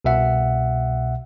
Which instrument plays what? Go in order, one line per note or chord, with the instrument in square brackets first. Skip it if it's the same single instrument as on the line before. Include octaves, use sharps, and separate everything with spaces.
[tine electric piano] C2 B2 E5 F#5